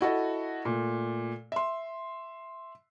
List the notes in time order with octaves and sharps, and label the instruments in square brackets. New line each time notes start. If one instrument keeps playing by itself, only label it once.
[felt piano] E4 F#4 A4 D#5
A#2 A3
E5 C6